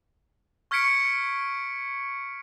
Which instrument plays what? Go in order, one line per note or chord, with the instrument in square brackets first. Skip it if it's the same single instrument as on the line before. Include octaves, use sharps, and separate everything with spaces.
[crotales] C#6 F6 G#6 B6 C#7 D7